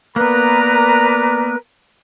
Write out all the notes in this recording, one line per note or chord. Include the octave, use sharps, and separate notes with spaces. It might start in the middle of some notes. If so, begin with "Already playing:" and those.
A#3 B3 A#4 B4 D5 A#5 F#6